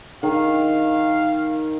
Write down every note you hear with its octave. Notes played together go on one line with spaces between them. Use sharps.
D#3 F5